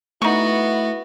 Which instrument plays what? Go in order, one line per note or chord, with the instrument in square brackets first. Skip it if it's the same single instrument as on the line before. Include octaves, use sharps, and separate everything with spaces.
[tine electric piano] A3 [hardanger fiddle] B3 F#4 [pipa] D#4 C#6 [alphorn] E4